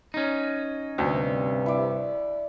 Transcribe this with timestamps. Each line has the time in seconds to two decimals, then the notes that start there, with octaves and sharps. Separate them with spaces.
0.14 C#4 D#4
0.98 D2 G2 C3
1.66 E4 D5